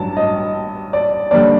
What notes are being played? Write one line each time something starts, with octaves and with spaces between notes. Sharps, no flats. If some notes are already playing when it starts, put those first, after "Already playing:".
Already playing: A1 G2 F#3 A5
D#5
D5
D#2 D3 G3 D5